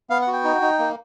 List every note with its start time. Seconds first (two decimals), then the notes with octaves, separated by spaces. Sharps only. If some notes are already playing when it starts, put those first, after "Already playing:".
0.10 B3 F5
0.22 F#5
0.27 F#4
0.33 G5
0.44 D#4
0.61 D#4
0.79 A#3